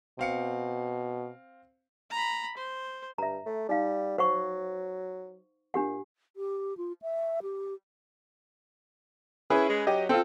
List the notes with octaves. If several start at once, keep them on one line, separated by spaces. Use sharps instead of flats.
B2 C4 F5 C#7
A#5 B5
C5
G2 E5 A#5
A3
G3 D#4 F5
F#3 C5 F#5 C#6
A#2 D4 G4 F#5
G4
F4
E5
G4
C#4 E4 G#4 B4
G#3
F#3 G4 D#5
C4 F4 A4